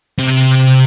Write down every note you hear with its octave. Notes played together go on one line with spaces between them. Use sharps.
C3